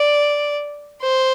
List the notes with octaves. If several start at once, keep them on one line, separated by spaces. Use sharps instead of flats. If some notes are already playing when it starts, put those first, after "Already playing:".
Already playing: D5
C5